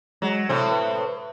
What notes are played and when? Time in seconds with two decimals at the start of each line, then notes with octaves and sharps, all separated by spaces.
0.22 F#3 G#3
0.49 A2 C3 C4
0.71 B4